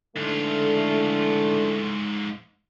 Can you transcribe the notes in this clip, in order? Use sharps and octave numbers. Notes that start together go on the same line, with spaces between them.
G#2 D3 E3 A3 F4